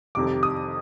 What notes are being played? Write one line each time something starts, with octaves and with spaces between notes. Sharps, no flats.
F2 C3 D#3 G3 D6
D#6